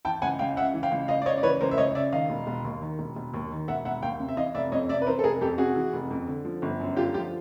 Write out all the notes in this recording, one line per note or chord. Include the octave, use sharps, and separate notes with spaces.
E3 G5 A5
C#2 F#5 G#5
C#2 F5 G5
C#3 E5 F#5
E3
F5 G5
C#2
C#2 D#5 F5
D5
C#3 C#5 D#5
D5
E3 B4 C#5
C#2 A#4 C5
E5
C#2 C#5 D#5
C#3 D5 E5
D#3 D#5 F5
E1
E1
D#2
D#3
E1
E1
D#2
D#3
E1 E5 F#5
E1 E5 F#5
D#2 F5 G5
C3
E5
E3 D#5 F5
F1 D5 E5
F2 C#5 D#5
C3 D5 E5
B4
E3 A#4 C5
A4
F1 G#4 A#4
F2 G4 A4
C3 F#4 G#4
E3
F1
F2
D3
F3
G1
F#2
D3 F4 G4
F3 F4 G4